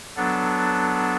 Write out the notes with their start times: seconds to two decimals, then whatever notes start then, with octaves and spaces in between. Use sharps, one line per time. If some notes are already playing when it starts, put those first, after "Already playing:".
0.16 F#3 B3 D4 A4